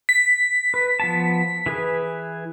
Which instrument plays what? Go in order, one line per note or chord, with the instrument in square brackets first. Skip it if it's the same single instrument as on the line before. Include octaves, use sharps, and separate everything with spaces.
[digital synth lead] B6
[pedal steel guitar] B4
F3 B3 A5
E3 G#4 B4